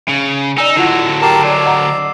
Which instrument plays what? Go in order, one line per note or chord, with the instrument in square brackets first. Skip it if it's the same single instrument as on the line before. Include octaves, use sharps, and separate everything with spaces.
[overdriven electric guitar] C#3
[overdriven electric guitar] D#4 [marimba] D5 G#5 [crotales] E6 E7
[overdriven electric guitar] D3 F#3 [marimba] E4 F4 F#5
[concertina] G4 A#4 A5 [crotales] D6 C7 E7
[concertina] D5
[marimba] D#5 F#5 A#5